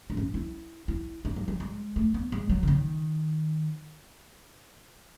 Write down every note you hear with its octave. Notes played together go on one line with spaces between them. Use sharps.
D#4
C#4
E4
E4
D#4
F#3
F#3
G#3
A3
B3
G#3
F#3
C#3
D#3